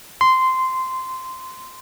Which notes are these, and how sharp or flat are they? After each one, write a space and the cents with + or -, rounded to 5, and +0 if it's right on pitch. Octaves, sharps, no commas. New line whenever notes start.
C6 -10